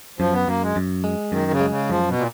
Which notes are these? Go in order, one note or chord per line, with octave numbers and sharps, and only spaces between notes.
F#2 F3
B3
F#2 A#3
G#3
F#2
G#3
F#2 D#3
C#3
G#3
C#3
F#2 F3
B2
A#2